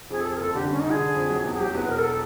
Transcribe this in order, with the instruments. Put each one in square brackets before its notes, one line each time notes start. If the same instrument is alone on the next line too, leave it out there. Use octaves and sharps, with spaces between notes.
[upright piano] F2 [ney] G#4
[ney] A4
[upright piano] F2
[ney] G#4
A#4
[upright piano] F#1 [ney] A4
[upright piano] D3 [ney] G4
[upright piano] G3 [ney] C#4
[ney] D#4
[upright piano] D3 [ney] G#4
[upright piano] D3
F2
F#3
E2
[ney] G#4
[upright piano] F#3 [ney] G4
[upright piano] E2 [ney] B4
[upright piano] E1 [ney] A#4
[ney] A4
A4